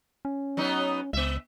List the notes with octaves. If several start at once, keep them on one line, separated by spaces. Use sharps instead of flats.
C#4
F#3 B3 D#4
C#2 B3 E5